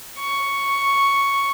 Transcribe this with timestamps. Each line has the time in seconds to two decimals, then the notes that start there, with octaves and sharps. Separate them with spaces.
0.18 C#6